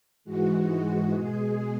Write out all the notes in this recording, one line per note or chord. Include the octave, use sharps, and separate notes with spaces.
G#2 E3 G#3 F#4
B2 G#3 G#4